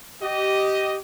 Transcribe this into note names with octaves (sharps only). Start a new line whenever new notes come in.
G4 D#5